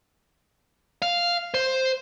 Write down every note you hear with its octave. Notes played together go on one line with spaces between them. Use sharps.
F5
C5